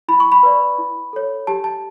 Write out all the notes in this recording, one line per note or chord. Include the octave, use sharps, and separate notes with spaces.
E4 B5
C#6
B5
B4 D5
E4
A4 C#5
G4 A5
A5